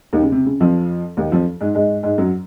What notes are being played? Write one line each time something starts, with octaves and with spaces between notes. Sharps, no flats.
D#2 D#3
C#3
C3
C#3
F2 F3
D#2 D#3
F2 F3
G#2 G#3
G#2 G#3
G#2 G#3
F#2 F#3